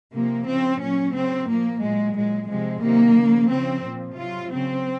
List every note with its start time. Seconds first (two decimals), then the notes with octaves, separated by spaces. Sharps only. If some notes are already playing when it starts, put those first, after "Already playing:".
0.14 C3 F3 A#3
0.48 C#3 F3 C4
0.81 A#2 F#3 C#4
1.15 C#3 F#3 C4
1.49 A#2 F3 A#3
1.82 A#2 F#3 G#3
2.16 A#2 F#3 G#3
2.49 C3 F3 G#3
2.83 C3 D#3 F#3 A#3
3.16 C#3 F3
3.50 C#3 F3 C4
3.84 A#2 F3
4.17 C3 F#3 F4
4.51 C#3 F#3 C4